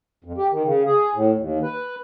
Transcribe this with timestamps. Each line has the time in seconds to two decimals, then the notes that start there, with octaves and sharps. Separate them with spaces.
0.24 F2
0.38 G4
0.52 D#3
0.64 C#3
0.86 G#4
1.15 A2
1.37 D#2
1.63 B4